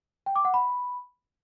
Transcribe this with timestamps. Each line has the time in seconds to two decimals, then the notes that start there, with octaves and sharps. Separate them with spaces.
0.26 G5
0.36 D6
0.45 F#5
0.54 B5